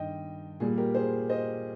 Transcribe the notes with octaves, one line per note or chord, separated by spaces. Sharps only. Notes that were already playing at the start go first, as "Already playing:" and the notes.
Already playing: G2 D#3 D#5 G5
A#2 G3 G#4
G4 A#4
G#4 C5
C5 D#5